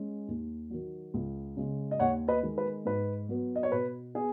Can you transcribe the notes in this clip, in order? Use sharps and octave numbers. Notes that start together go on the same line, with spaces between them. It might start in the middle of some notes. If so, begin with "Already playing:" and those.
Already playing: G#3 C#4
D#2
D#3 F#3
C#2
C#3 G#3
D#5
D#2 C#5 F#5
B4 D#5
D#3 G#3
B4
G#2 B4
F#3 B3
D#5
C#5
B2 B4
B3 G#4